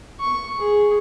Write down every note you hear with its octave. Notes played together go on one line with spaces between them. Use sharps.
C#6
G#4